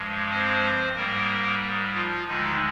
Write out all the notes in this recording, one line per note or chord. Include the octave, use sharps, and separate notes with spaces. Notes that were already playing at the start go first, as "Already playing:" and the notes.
Already playing: G2 F3 G#3
C4 C5
G#2 G3 A#3 A#4
F3 F4
D2 D3 D#3 G#3 D#4